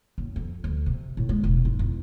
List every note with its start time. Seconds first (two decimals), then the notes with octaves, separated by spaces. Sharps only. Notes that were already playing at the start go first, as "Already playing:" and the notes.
0.18 F#1
0.36 F2
0.64 D2
0.86 C3
1.17 A2
1.29 G#3
1.44 E1
1.65 G#2
1.79 E2